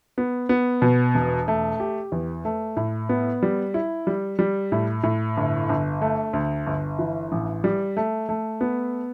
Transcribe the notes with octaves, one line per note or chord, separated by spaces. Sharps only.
B3
B3
B2
E1
A3
G4
E2
A3
A2
B3
G3
E4
G3
G3
A2
A2
G1
G1
A3
D2
G1
E3
A1
G3
A3
A3
B3